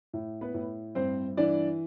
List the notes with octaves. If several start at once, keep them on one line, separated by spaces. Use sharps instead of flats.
A2
B3 B4
A2
G2 C4 C5
E3 D4 D5